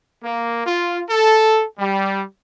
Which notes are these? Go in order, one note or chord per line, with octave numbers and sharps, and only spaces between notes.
A#3
F4
A4
G3